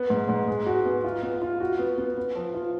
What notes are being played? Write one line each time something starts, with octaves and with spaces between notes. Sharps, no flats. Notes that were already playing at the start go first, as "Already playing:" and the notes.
Already playing: B3
G#2
G#2
G#3
F#4
B3
F4
B3
F4
F#4
B3
B3
B3
F3
F4